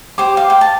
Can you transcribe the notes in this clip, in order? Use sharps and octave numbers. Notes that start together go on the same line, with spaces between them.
G4 C5 D6
F5
G5
A5